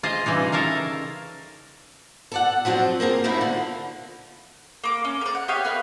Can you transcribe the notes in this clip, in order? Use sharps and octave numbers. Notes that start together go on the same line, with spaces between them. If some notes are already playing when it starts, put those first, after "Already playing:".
F4 G#4 C5 D#5
C#3 E3 G3 D#4
A4 A#4 C#5 F5 A#5
A4 D5 F#5
F3 F#3 C4 D4
A#3 C4 G#4 A#4
F3 A3 A#3 C#4 D#4 E4
D3
A#3 D6
C#4
A#4 D5
F#5
B3 G4 C#5 F5
A#4 B4 F5